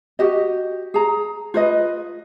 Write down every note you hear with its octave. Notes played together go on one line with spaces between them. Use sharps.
F#4 G4 D#5
G#4 A#5
F4 B4 D#5